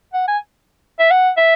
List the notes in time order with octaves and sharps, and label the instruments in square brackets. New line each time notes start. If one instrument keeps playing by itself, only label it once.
[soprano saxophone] F#5
G#5
E5
F#5
E5